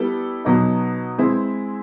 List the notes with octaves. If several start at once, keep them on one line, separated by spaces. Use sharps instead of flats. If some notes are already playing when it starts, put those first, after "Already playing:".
Already playing: G3 B3 E4 A4
B2 F#3 B3 D#4
G#3 C4 E4